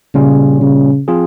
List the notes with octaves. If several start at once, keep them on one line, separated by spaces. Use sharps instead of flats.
A#2 C#3 G3 C#4 F4
C#3
F3 C4 F4 G#4